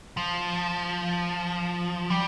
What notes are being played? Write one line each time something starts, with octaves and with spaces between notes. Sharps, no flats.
F3
G3